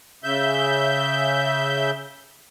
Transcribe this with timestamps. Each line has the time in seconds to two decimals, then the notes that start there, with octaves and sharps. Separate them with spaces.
0.24 C#3 E5 G6